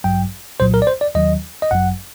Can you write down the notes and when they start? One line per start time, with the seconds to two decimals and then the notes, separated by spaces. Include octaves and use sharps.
0.04 A1 G2 F#3 G5
0.60 C2 A#2 F#3 C5
0.74 A#4
0.82 D5
0.87 C5
1.01 D5
1.15 D#2 D#3 F#3 D#5
1.62 D#5
1.71 G1 F#2 F#3 F#5